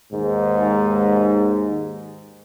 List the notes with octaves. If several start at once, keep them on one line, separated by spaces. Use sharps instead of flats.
D#2 G#2